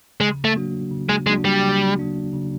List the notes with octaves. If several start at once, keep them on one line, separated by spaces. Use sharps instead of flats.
C#3 G#3
A3
F#3 A#3 D4 F#4
C#3
G#3
F#3 G#3 A#3 D4 F#4
G3
C#3
F#3 A#3 D4 F#4
C#3